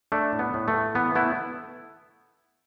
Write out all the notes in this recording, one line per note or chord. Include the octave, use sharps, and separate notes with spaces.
A3 D4
A2
B3
A2
A3
A2
E3 B3
A3 B3 E4